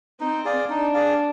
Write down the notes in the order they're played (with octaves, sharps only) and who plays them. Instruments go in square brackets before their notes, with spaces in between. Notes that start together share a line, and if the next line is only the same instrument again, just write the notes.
[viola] C4 [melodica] D#4
[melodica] G#4 D5 F5
[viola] D4 [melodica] D#4
[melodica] G#4 D5 F5